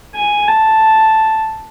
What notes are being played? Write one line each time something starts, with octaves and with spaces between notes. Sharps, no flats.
G#5
A5